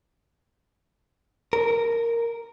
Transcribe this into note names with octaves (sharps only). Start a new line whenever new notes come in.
A#4